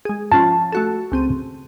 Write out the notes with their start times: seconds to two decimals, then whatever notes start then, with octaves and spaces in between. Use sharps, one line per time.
0.05 G#3 G#4
0.32 F3 C#4 F4 A5
0.72 A3 F#4 A4
1.12 C#2 C4 D#7